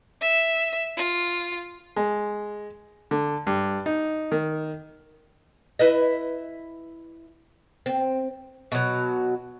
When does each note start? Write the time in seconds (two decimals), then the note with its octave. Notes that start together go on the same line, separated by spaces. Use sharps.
0.21 E5
0.97 F4
1.96 G#3
3.11 D3
3.47 G2
3.86 D#4
4.32 D#3
5.79 E4 B4 D#5
7.86 C4
8.72 B2 F#3